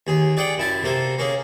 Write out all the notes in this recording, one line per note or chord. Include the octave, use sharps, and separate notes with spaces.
D#2 G#4
G#4 D5 F#5 G5
F#2 E4 A5
C3 A#3 A4
A#3 C#4 G#4